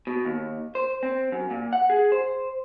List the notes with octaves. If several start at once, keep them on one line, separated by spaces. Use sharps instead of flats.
B2
D#2
C5
C4
F#2
A#2
F#5
G#4
C5